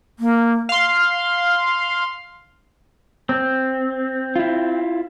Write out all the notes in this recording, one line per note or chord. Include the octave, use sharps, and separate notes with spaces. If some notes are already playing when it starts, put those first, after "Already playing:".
A#3
F5 C6
C4
E4 F4